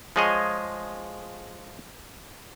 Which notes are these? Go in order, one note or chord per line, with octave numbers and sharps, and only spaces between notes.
F3 G#3 G#4 C#5 D#5